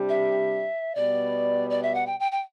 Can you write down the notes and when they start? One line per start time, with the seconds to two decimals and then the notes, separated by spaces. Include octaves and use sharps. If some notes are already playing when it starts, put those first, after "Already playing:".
Already playing: C3 G3 D4 G4
0.09 E5
0.95 B2 G3 B3 D5
1.70 D5
1.83 E5
1.94 F#5
2.06 G5
2.20 G5
2.31 G5